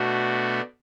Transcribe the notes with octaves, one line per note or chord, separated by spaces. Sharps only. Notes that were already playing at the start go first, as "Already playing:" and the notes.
Already playing: B2 A3 D4 F#4